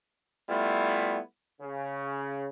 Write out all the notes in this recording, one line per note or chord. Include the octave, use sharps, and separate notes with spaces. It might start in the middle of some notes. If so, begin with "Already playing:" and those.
G3 A3 B3 E4 F4
C#3